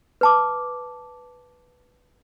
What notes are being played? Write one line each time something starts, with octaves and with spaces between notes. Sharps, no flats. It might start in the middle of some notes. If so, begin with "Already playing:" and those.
B4 A5 D6